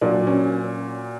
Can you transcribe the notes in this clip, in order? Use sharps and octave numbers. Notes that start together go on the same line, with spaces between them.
A#2 F#3 D4
C#4